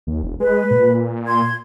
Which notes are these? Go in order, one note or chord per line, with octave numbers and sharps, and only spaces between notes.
D#2
E1
G#3 B4
A#2
C6 G#6